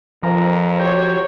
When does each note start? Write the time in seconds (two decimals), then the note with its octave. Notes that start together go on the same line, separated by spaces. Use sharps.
0.23 F2 F3 A#4
0.79 F#4 G4 C5 C#5